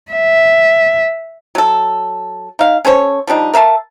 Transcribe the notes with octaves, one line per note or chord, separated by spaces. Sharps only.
E5
F#3 A4
D#4 F5
C#4 A4 C5 C#5
F3 G3 D4 D#4
A#4 E5 F5 A5